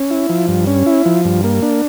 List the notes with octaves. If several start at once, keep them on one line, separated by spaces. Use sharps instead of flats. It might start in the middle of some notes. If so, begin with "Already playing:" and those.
Already playing: C#4
E4
F3
G2
C#4
E4
F3
G2
A#3
D4